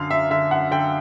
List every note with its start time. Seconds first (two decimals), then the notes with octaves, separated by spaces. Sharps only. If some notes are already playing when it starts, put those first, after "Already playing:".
Already playing: F#2 D3 F5
0.10 F#2 E5
0.30 D3 E5
0.51 F#2 F#5
0.71 D3 G5